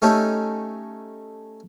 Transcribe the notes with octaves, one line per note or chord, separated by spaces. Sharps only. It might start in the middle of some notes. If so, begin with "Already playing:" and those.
A3 C#4 D#4 G4 A4